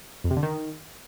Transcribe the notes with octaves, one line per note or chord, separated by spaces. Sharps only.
F2
C3
D3
D#3